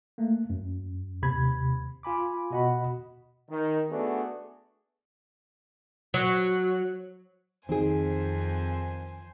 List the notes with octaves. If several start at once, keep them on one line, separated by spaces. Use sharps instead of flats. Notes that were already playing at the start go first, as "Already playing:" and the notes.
A3 A#3
F#2
D#2 C3 B5 G#6
F4 G#5 B5 D6
B2 F#4 D#5 F#5 B5
D#3
A3 B3 D4 F#4 G#4 A4
F#3
F2 D#3 C4 G#4 C5 G#5